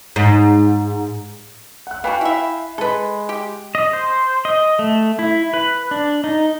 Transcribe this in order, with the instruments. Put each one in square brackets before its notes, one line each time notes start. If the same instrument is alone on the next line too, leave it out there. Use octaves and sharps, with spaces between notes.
[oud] G#2
[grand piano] F#5 F#6
[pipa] B3 D4 F#4 [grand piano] F5 G5 G#5
[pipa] E4 E5
[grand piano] G#3 [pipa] A4 B4
[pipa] G4
[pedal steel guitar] D#5
C5
D#5
A3
E4
B4
D4
D#4